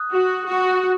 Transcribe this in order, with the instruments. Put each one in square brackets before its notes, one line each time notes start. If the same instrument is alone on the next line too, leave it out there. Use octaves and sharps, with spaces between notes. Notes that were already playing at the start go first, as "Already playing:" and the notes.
Already playing: [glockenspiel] D#6 F#6
[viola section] F#4
F#4